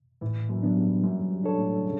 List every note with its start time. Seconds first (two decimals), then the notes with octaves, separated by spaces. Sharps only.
0.21 A2 E3
0.49 F#2
0.62 F#3 B3 D4
0.76 G2
1.04 F#2 G3
1.19 F#2
1.31 G2
1.44 D4 A4 C#5
1.58 A2
1.85 C#3